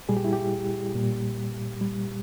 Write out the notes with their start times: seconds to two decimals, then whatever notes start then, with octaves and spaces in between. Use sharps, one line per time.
0.09 A#2 G3 G#4
0.17 G4
0.24 E4
0.33 G4
0.95 A#2 G3
1.81 A#2 G3